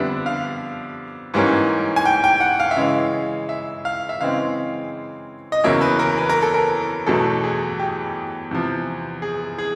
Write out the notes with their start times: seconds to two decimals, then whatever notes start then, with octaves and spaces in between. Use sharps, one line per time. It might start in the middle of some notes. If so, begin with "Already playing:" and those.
Already playing: F2 D3 G3 B3 D4 E5
0.26 F5
1.34 G#2 E3 G3 A#3 C#4
1.96 G#5
2.05 G5
2.24 G5
2.40 F#5
2.60 F5
2.71 E5
2.76 C#3 E3 G#3 F5
3.49 E5
3.85 F5
4.09 E5
4.21 C#3 E3 G#3 C4 F5
5.52 D#5
5.64 E2 C#3 F#3 A#3 C#4 E5
5.81 B4
5.99 A#4
6.18 B4
6.30 A#4
6.42 A4
6.54 A#4
7.07 E2 B2 F#3 A3 A4
7.44 G#4
7.79 G4
8.51 E2 C3 F3
9.22 G#4
9.58 G#4